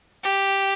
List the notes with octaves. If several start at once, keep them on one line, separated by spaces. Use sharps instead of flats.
G4